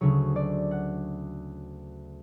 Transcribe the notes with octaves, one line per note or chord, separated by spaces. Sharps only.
D2 C#3 F#3 C#5
D5
F#5